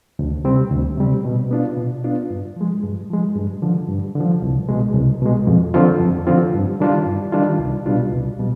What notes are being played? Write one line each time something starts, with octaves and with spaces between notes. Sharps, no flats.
D2
C3 G3 C4
D2
C3 G3 C4
B2
B3 D4 F4
B2
B3 D4 F4
G2
F3 G#3
G2
F3 G#3
G2
D3 F3
G2
D3
F3
C2
B2 G#3
C2
B2 G#3
F2
D3 F3 C4 F4
F2
D3 F3 C4 F4
G2
D#3 G3 D4 F4
G2
D#3 G3 D4 F4
C2
B2 G3 D4 F4
C2
B2 G3